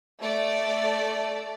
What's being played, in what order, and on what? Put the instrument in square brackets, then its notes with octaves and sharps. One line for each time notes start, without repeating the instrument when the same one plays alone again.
[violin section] A3 D5